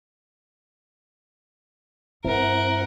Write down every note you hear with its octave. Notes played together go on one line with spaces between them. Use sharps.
G2 C4 E4 A#4 F#5